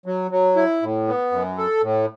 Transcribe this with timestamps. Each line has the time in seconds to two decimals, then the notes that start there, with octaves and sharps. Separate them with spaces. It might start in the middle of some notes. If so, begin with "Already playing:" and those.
0.06 F#3
0.31 F#3
0.56 E4
0.82 A2
1.07 B3
1.32 F#2
1.58 A4
1.82 A2